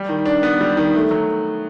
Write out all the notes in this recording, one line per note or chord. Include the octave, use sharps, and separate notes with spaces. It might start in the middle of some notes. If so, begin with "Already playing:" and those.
Already playing: G3
D#3
D4
B3
G3
D#3
A3
F#3